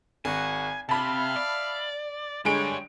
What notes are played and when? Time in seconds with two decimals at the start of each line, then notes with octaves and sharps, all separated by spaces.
0.25 G#1 F#4 G#5
0.89 C3 E5 F5 A5 B5
1.36 D5
2.45 D3 G3 G#3 D4 C#5 D7